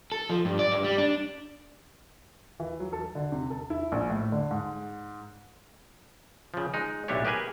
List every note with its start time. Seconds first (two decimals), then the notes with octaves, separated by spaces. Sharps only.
0.12 A4
0.30 F3
0.45 G2
0.59 D5
0.72 G2
0.84 G3
0.98 D4
2.60 E3
2.80 F#3
2.93 A4
3.15 D3
3.32 C3
3.50 A4
3.70 E4
3.92 A#1
4.10 A2
4.32 D3
4.51 G#2
6.54 C#3 F3
6.74 G#3 D#4
7.08 B1 A2 A3 D4 G4 C#5
7.25 G4 G#4 A#4 B4 G#5